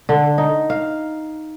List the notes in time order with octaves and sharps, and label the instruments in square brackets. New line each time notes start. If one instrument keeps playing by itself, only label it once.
[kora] D3
D#4
F5